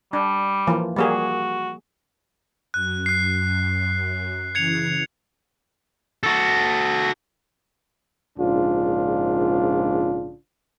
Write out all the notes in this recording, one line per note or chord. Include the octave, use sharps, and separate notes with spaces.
G3 D4
E3 F3 A#3
G3 A#3 F#4 G#4
F#2 F#6
F#6 C7
C#3 E3 G#6 C#7 F7
F#4 A4
A#1 G#2 C#3 D4 F4